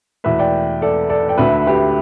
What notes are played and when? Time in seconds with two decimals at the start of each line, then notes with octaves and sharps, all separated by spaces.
0.24 E2 B2 A3 B4 E5
0.39 D5 G5
0.82 A4 D5
1.09 A4 D5
1.28 D5 G5
1.38 D2 D3 A3 B4 E5
1.67 G4 B4